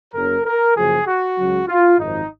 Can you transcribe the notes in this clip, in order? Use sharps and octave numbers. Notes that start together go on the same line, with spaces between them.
F#1 F#2 C#3 A#4
A#4
F#1 F#2 F3 G#4
F#4
C#2 C#3 F#3
F4
G#1 F#2 F3 D#4